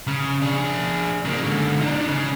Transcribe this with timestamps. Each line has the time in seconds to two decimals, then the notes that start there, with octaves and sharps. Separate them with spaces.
0.08 C#3
0.42 D4 G#4
1.25 C#3 A#3
1.44 G#2 D3
1.81 D4 D#4
2.07 C#3